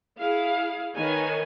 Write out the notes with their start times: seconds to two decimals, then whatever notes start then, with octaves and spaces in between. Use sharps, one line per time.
0.19 E4 G#4 F5
0.95 D#3 D#4 B4 C#5 G#5